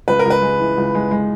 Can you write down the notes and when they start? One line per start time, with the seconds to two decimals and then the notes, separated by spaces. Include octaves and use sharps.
0.08 C#2 B4
0.19 A#4
0.25 C#2
0.30 B4
0.42 G#3
0.60 E3
0.77 C#2
0.95 G#3
1.11 G#3